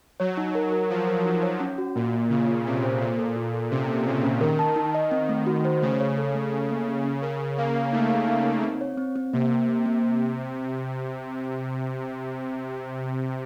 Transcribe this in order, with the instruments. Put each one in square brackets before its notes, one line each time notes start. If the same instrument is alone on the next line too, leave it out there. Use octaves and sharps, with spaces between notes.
[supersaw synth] F#3 [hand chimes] C#5
[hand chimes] D#4
A#4
A#4
[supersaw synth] F3 [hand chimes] A#4
[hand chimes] A#4
D#4
C#5
C#4
F#4
[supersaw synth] A#2 [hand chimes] A#3
[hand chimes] A#3
[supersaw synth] C#3 [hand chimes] F4
[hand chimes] F4
[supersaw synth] C3 [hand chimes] C4
[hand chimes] C5
[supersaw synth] A#2 [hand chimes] A4
[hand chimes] A4
F4
A4
[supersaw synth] C3 [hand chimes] C#4
[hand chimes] A4
[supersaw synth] C#3 [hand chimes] A#3
[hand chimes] C#4
[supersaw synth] D#3 [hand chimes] A#4
[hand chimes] A5
D#4
D#5
C4
A3
F#4
C5
[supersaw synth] C#3 [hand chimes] A3
[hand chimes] C#5
A4
A3
A4
A#3
C#4
C#4
[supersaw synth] C#3 [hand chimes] A#4
[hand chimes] A#4
[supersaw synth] A#3 [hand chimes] F5
[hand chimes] F5
[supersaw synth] A3 [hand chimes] D#4
[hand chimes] F5
D#4
D#4
C4
C#5
C4
C4
[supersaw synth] C3 [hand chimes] A#3
[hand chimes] A#3
A#3
A#3